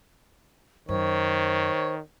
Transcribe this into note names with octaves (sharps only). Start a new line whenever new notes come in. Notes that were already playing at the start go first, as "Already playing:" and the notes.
F#2 D#3 C5 C#5